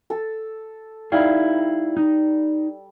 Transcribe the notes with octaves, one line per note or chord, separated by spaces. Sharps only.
A4
G3 D#4 E4 F5
D#4